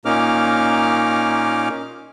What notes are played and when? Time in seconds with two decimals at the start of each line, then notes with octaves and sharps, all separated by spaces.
0.05 A#2 A#3 C#4 D#4 D6 F6